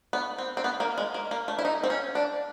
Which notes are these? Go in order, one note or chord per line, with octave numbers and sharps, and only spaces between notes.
B3
C4
C4
B3
A#3
G#3
A#3
A#3
A3
E4
D#4
C4
C#4
D4